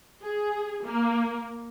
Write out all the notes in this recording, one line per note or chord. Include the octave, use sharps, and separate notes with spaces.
G#4
A#3